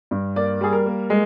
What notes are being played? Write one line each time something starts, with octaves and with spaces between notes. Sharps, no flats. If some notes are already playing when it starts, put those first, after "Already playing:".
G2
A#3 D5
G3 G#4
A#4
A#3
G#3